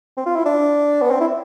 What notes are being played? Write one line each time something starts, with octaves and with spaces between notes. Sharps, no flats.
C4
F4
E4
D4
B3
C4
E4